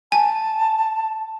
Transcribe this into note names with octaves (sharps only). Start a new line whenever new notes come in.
G#5 A5